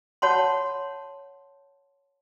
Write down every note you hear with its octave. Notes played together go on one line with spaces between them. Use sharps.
C#5 F#5 A5 B5 C6